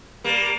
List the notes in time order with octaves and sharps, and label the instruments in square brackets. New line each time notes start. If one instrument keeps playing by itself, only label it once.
[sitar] G3 A#3